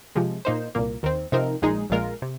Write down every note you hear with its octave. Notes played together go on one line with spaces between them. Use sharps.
C3 F3 G#3
A#2 A#3 D#4 C5
C2 A#2 A#3
D#2 D#3 C4
C3 F3 C4 D#4 A#4
A#1 A#2 G#3 D#4 G#4
A#1 A#2 G#3 F4 A#4
C3